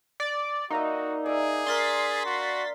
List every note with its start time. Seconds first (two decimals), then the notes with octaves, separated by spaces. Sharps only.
0.20 D5
0.70 A#3 D#4 F#4 D5 E5
1.26 G#4 D5 E5
1.66 D4 A#4 C6 A6 B6
2.26 F#4